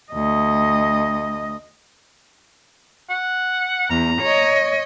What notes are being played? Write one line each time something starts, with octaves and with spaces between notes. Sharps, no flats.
D2 D#5
F#5
E2 A#5
C#5 D#5